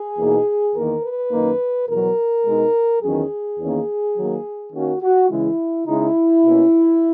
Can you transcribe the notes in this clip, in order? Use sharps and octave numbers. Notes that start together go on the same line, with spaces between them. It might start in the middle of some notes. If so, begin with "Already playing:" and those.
Already playing: G#4
E2 B2 A#3 D#4
E2 D#3 A#3 A#4
B4
F#2 D#3 A#3 D#4
E2 B2 F#3 A#4
B2 G#3 D#4
E2 D#3 F#3 C#4 G#4
E2 D#3 A#3 C#4
D#3 F#3 A#3
D#3 A#3 C#4 F#4
F#4
C#3 E3 G#3 E4
C#3 G#3 D#4 E4
B2 A#3 C#4